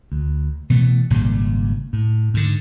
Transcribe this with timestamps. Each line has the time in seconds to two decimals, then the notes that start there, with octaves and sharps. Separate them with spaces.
0.12 D2
0.70 B2 E3 A3
1.10 G#1 A#2 C#3 G3
1.93 A2
2.34 G#2 D3